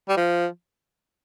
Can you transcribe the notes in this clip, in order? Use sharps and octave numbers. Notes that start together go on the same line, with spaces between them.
G3
F3